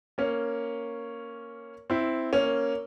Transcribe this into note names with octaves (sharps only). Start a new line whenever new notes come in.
A#3 C#4
C4 E4
A#3 C#4